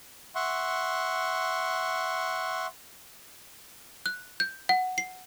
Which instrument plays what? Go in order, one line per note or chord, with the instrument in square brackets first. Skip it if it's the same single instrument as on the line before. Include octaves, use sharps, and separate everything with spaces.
[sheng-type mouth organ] E5 F#5 C6 C#6
[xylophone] F#6
G6
F#5
C7